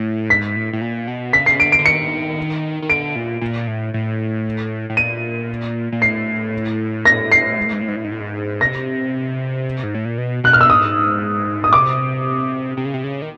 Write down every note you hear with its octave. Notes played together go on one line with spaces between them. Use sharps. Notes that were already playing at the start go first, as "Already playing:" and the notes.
Already playing: A2
G#2 B6
A2
A2
A#2
B2
C#3 B6
C7
D3 D7
D7
D3
D#3 C#7
D#3
D3 D7
A#2
A#2
A2
A2
A2
A#2 D#7
A#2
A2 C7
A#6
C7
G#2
A2
G#2
A2
G#2
A2
G#2
A2
G#2
C3 A#6
G#2
A2
A#2
B2
B2 F#6
F6
E6
G#2 D#6
D#6
C3 D6
C3
C#3
C3
C#3
D#3